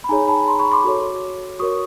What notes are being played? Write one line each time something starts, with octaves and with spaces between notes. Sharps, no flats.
B5
D#4 G#4 C#5 G#5 A#5
A5 B5
A#5 C6
B5 C#6
C6 D6
F#4 A4 C#5
F#4 A#4 C#5 C#6 D#6